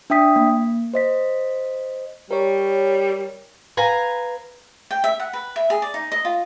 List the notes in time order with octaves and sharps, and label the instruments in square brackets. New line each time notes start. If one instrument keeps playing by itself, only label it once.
[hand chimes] D4 E5 G5 D#6 B6
A#3
C5 D#5 B6
[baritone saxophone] G3 [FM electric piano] A#4 C#5
[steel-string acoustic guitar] B4 F5 G#5 A#5
[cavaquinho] G5
E5
F#5
B4
E5
G#4
D5
D#4
D#5
F4